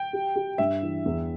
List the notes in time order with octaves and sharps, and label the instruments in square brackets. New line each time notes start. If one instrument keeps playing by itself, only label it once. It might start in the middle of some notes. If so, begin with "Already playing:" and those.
Already playing: [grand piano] G5
[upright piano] G4
G4
[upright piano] G2 [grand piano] E5
[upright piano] E3
E2